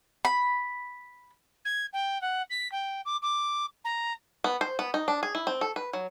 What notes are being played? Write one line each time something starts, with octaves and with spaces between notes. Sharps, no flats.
B5
G#6
G5
F#5
B6
G5
D6
D6
A#5
B3
C5
B3
D#4
D4
G#4
E4
C4
A4
B4
F#3